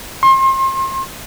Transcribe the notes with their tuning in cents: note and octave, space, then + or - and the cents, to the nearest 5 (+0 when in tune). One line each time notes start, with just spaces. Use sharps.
C6 +35